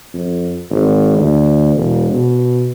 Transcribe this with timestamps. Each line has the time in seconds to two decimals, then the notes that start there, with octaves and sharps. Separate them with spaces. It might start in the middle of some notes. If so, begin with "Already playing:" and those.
0.13 F2
0.70 G#1
1.17 D2
1.75 E1
2.11 B2